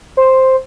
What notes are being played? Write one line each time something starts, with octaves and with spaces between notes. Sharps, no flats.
C5